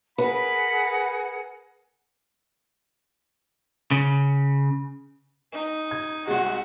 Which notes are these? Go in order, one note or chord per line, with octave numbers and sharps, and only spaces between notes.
G#4 A#4 B4 F#5 B5
C#3
D#4
G#6
C2 G#3 F#4